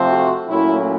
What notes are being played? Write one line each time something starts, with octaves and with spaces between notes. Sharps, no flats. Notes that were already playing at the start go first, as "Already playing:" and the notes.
Already playing: F2 C3 F3 A3 C4
F#4
A#2 F#3 A3 C#4 E4